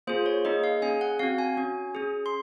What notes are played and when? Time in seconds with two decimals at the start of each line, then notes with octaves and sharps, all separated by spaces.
0.07 A#3 F4 G#4 C5
0.26 C#5
0.45 A#3 D#4 G#4 D#5
0.64 F5
0.82 C#4 G#4 G#5
1.01 F#5
1.19 C4 F#4 F5
1.38 G#5
1.57 C#4 F#4
1.95 C#4 G#4
2.26 C6